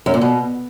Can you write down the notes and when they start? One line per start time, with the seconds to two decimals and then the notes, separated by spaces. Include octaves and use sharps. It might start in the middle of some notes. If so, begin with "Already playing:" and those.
0.06 F#2
0.14 A#2
0.21 B2